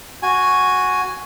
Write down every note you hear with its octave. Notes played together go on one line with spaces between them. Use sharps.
F#4 G#5